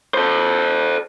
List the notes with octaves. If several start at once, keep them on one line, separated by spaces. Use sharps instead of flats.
A4 C5